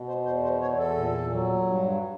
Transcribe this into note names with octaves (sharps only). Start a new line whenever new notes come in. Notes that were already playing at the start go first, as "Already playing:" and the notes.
Already playing: B2
C5
E2 C5
C5
E2 C#5
A4
A#2
F#3
G2